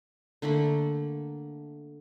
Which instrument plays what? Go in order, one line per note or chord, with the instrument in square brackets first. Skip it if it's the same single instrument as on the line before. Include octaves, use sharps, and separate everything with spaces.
[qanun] D3 A3 A#3 B5